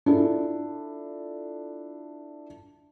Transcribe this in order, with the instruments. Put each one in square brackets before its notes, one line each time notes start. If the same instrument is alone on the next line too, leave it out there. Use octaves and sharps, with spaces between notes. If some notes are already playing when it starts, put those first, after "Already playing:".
[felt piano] D4 E4 F4 A4